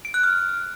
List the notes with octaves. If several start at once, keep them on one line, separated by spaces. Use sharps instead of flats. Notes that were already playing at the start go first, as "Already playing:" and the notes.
D7
F#6
F6